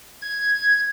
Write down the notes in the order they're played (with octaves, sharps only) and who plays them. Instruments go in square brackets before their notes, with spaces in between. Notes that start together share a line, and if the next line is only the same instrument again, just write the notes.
[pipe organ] G#6